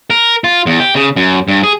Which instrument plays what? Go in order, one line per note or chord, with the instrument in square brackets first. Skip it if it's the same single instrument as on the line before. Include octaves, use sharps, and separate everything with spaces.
[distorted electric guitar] A#4
F4
E2
G4
C#3
F#2
G2
G#4